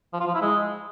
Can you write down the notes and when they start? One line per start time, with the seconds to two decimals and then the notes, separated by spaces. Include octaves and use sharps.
0.13 F3
0.20 F4
0.27 F3
0.34 E4
0.41 G#3